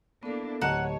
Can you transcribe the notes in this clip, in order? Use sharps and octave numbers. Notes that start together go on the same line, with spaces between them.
A#3 B3 D4 E4 A4
D1 G4 C#5 D#5 F#5 A5 A#5 E7